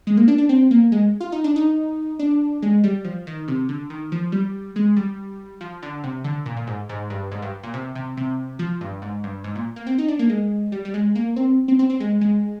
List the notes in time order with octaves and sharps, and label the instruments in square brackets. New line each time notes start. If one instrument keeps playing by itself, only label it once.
[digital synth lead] G#3
A#3
D4
D4
C4
A#3
G#3
F4
D#4
D4
D#4
D4
G#3
G3
F3
D#3
C3
D3
D#3
F3
G3
G#3
G3
F3
D3
C3
D3
A#2
A#2
G#2
G#2
G2
G#2
G2
A#2
C3
C3
C3
F3
G2
G#2
G2
G#2
A#2
A#3
C4
D#4
D4
A#3
G#3
G3
G3
G#3
A#3
C4
C4
C4
C4
G#3
G#3